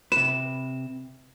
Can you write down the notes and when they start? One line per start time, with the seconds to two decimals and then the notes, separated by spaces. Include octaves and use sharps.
0.12 C3 B4 E7